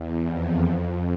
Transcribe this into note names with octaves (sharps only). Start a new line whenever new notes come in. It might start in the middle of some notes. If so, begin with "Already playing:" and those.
Already playing: E2
F2
F2